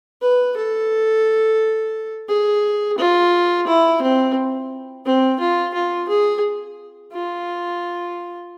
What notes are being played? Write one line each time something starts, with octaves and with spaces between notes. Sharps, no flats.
B4
A4
G#4
F4
E4
C4
C4
F4
F4
G#4
F4